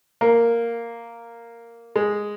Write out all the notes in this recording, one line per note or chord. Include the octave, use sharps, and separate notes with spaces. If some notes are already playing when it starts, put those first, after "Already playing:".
A#3
G#3